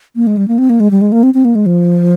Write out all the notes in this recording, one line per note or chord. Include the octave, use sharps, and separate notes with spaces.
A#3
G#3
G3
A#3
C4
A#3
G#3
G3
G#3
A#3
C4
C4
A#3
G#3
F3